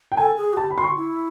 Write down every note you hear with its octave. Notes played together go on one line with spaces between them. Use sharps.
G5
A4 G#5
G#4
F#4
G4 A5
B5
F#4 C6
C#6
E4